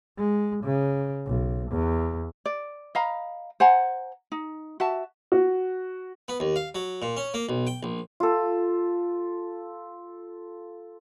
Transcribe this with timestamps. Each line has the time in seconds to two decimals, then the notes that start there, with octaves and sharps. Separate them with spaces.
0.18 G#3
0.64 C#3
1.27 B1
1.71 E2
2.46 D5
2.95 D#5 F5 A#5 B5
3.60 C5 F#5 G#5 A#5
4.32 D#4
4.80 F#4 E5 A5
5.32 F#4
6.28 B3
6.40 D#2
6.56 F5
6.75 F#3
7.02 A#2
7.17 C#4
7.34 A#3
7.49 B1
7.67 G5
7.83 A#1
8.20 F4 A4